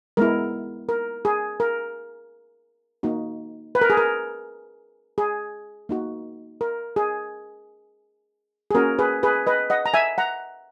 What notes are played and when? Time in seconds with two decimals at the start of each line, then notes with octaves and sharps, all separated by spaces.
0.17 G#3 B3 E4 A#4
0.89 A#4
1.25 G#4
1.60 A#4
3.03 A#3 D#4 F#4
3.75 B4
3.81 A#4
3.90 G#4
3.97 A#4
5.18 G#4
5.89 A#3 D#4 F#4
6.61 A#4
6.96 G#4
8.71 G#4
8.74 A#3 C#4 F#4 A#4
8.99 G#4 B4
9.23 G#4 B4
9.47 B4 D#5
9.70 D#5 F#5
9.86 A#5
9.94 E5 G#5
10.18 F#5 A#5